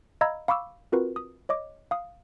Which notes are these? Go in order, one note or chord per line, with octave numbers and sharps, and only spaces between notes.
D#5 F5 A#5 B5 E6 G#6
F5 B5 C#6 D6 E6
C4 F4 F#4 A#4 B4
D#6
C#5 D#5 D6
F5 D#6